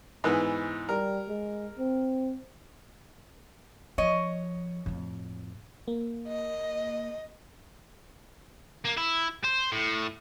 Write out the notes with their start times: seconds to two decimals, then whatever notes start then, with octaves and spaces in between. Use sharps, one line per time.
0.24 G#2 E3 B3
0.89 G3 A#4
1.28 G#3
1.79 C4
3.98 F3 C#5 D#5
4.86 F2 A2
5.88 A#3
6.27 D#5
8.85 A#3
8.98 E4
9.44 C5
9.72 A2